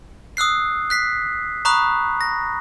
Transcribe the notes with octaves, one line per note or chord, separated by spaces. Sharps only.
D#6 E6 F#6 C7
F#6 B6 C7
A#5 B5 C#6 D#6 F#6
A#6